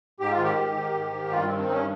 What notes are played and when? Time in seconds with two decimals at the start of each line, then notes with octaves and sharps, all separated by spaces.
0.20 G#2 G4
0.31 F4
0.38 D#3
0.43 G4
0.57 G#2
0.75 D#3
0.93 G#2
1.12 D#3
1.31 G2 F4
1.44 D#3 C4
1.58 C4
1.67 G2 D#4
1.72 C#4